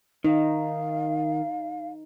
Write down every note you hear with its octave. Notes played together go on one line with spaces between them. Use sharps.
D#3 D#4 F5